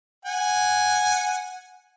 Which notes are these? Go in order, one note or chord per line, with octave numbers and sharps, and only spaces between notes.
F#5 G#5